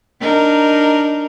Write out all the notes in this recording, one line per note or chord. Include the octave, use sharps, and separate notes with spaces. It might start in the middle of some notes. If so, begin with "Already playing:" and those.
D4 D#4 A#4